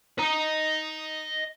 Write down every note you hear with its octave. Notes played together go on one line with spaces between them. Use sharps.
D#5 A#5